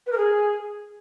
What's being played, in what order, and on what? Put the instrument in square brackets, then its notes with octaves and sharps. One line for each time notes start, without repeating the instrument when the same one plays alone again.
[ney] B4
A#4
G#4